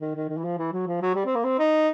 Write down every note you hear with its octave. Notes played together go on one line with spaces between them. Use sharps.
D#3
D#3
D#3
E3
F3
E3
F#3
F3
F#3
G3
C4
A#3
C4
D#4